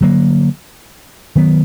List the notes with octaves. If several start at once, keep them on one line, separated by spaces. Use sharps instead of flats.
D3 F#3 A#3
D#3 F#3 B3